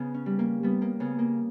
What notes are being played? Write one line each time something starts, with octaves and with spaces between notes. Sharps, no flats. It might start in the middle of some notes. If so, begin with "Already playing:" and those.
Already playing: C#3 B3
C#4
G3
A#3
G3 B3
A#3
C#3 B3
A#3